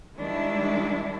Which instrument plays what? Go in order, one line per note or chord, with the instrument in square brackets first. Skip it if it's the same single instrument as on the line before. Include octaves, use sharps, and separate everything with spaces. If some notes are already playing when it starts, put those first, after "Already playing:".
[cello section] D#3 G3 G#3 D4 E4